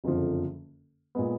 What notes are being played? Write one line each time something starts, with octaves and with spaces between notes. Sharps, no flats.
F#1 F2 D3 F3
A#2 G#3 B3